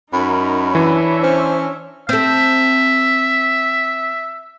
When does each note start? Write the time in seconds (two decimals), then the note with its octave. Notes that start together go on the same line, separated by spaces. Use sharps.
0.13 F#2 D#4 A#4 B5
0.75 E3 D4 C#5 E5
1.23 C#4 C5
2.09 C4 A4 E5